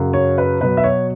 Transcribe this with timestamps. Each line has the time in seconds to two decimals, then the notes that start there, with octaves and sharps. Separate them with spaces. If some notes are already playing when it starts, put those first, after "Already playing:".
Already playing: F#2 C#3 F#3
0.13 C#5
0.38 B4
0.61 B2 F#3 B4
0.77 E5
0.84 C#5